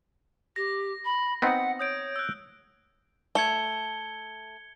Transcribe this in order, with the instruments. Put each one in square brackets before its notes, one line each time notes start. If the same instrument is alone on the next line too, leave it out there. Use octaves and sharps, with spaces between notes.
[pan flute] G4 [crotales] A#6
[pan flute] B5
[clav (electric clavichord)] B3 C4 D#4 [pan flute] F#5
[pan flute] C#5 [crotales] D#6 G6 D7
[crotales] E6 F#6
[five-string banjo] A3 [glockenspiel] G#6 C#7 G7